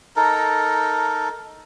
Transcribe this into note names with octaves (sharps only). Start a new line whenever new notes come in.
D#4 A4 A#4